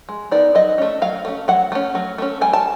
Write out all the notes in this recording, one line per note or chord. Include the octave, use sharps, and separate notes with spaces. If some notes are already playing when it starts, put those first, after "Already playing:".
G#3
B3 D#4 D5
F#3 D#5
A3 C#4
F#3 F5
A3 C#4
F#3 F#5
A3 C#4
F#3
A3 C#4
G3 G#5
A5